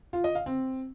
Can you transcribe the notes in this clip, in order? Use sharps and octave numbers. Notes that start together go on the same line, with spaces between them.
F4
D#5
F5
C4